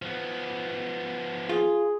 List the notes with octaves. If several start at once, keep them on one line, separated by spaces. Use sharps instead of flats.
F3 B3
F4 G#4